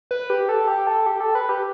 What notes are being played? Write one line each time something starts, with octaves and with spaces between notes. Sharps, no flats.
B4
G4
A4
G4
A4
G4
A4
B4
G4